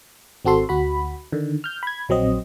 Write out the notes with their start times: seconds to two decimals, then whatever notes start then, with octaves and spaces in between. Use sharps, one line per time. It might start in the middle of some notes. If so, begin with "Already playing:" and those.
0.45 G#1 C4 F#4 A4 C6
0.69 D2 F#4 B5
1.32 D3 D#3
1.64 F6 G6
1.83 B5 G#6
2.09 A#1 F#3 C4 D#5